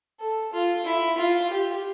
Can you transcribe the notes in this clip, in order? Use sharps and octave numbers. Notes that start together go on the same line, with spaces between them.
A4
F4
E4
F4
G4